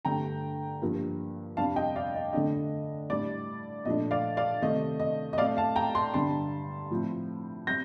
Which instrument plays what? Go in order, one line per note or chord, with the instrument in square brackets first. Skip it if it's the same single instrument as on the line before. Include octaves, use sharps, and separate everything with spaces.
[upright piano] G2 D3 A3 G5 A#5
G2 F3 A#3
F2 C3 G3 D4 F5 A5
D#5 G5
D5 F5
D#5
D3 A3 D4 D#5
A2 G3 D4 D5
A#2 F3 A3 D4 D#5
D5 F5
D5 F5
C3 D#3 A3 C4 D#5
D#5
D#5
A2 A3 C4 D5 F5
F5 A5
G5 A#5
A5 C6
G2 D3 G3 A5 C6
A2 F3 C4
G3 C4 G6 A#6